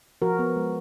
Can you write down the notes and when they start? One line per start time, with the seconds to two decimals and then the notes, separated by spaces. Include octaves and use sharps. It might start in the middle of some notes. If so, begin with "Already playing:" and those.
0.22 F3 F#4 A#4
0.39 B3
0.56 G#3